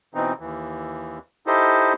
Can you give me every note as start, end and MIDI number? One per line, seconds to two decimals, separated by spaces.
0.15 0.33 47
0.15 0.33 52
0.15 0.33 60
0.15 0.33 63
0.40 1.18 39
0.40 1.18 52
1.47 1.93 63
1.47 1.93 64
1.47 1.93 67
1.47 1.93 69
1.47 1.93 72
1.47 1.93 75